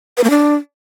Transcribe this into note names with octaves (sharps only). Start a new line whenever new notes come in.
B4
A#3
D4